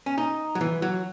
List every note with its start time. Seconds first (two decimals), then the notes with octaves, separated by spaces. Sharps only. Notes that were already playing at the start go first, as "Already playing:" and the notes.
0.06 C#4
0.18 D#4
0.55 F#3
0.61 E3
0.82 F#3